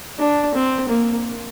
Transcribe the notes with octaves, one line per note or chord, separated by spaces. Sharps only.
D4
C4
A#3